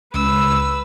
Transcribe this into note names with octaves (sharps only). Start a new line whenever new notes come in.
C#2 B4 E6